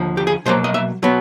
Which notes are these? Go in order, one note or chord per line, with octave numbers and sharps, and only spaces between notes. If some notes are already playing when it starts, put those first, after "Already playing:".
Already playing: D#2 D3 F3
G4
G#4
B2 F#3 A#3 C5
D#5
E5
B2 F#3 B3